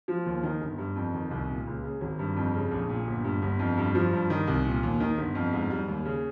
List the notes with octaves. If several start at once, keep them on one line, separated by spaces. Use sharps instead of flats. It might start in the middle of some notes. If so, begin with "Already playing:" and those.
F3
D#2
D#3
G1
G2
F2
D#3
C2
A#2
C#2
C#3
G#1
G2
F2
C#3
A#1
A#2
G1
G2
G1
F2
G2
F3
G2
D#3
C2
A#2
D#2
D#3
G1
F2
G#2
G3
D#2
C#3